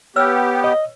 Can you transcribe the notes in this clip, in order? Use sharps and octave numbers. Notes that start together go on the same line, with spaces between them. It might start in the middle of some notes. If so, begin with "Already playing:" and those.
B3 G4 B4 C#5 E6
D#5